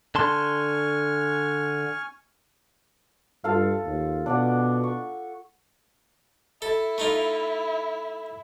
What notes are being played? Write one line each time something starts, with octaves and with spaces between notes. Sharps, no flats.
D3 G#5 A5 C6 C#6 F6
G2 F4 A4 F5
D#2
B2 D4 D5 F#5
C#6
E4 A4
A3 D#4 F4